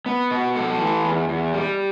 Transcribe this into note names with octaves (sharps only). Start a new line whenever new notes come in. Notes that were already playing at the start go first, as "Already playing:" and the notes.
B3
B2
A4
E3
E2
E2
G3